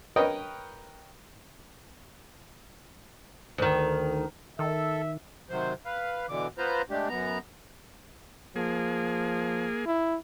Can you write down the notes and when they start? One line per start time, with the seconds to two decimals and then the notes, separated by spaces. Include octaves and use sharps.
0.16 A#4 B4 C#5 D#5 G5
3.58 D2 D#3
4.59 D#3 A4 E5
5.49 C3 D#3 F#3 C5
5.85 B4 F5
6.29 B2 D3 E3 D6
6.58 B3 F4 B4 C5 A#5
6.90 G#3 A3 D4 G4
7.09 F#2 B3 A#5
8.56 F3 A#3 G#4
9.86 E4